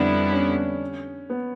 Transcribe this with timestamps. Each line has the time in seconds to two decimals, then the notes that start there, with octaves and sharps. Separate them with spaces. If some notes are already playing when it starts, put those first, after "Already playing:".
Already playing: F2 D3 G3 B3 D4 E4
0.32 C#4
1.30 B3